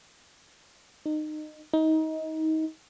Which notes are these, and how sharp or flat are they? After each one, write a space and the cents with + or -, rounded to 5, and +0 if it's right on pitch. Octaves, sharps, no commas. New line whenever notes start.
D#4 -25
D#4 +25